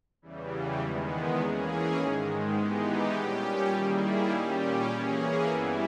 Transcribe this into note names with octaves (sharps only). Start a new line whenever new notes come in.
E2 C#3 E3 G3
E2 D#3 G#3 B3
E3 A#3 C#4 G#4
G#2 D#3 G#3
E3 G#3 B3 D#4 G4
A#2 G3 C#4 G4
D#3 G3 A#3 E4 G#4
A#2 G3 C#4 G4
E3 A#3 C#4 G#4
G2 E3 G3 B3 E4